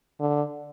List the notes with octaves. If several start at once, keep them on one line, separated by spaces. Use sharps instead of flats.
D3